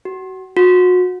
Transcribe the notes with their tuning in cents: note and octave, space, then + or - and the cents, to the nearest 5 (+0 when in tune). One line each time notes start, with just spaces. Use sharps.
F#4 +30
F#4 -30